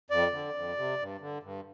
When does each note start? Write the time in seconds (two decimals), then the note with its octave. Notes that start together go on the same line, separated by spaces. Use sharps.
0.10 F2 D5
0.32 D3
0.55 F2
0.77 C3
0.99 G2
1.21 D3
1.43 G2